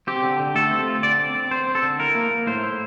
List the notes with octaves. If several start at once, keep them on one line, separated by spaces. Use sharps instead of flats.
C4 G4
D3
D3
A3 A4
C4
F4
D3 D5
C4
C4
C4 C5
C4
A4
D3
E4 A#4
A#3
A#3
A2 C5
E4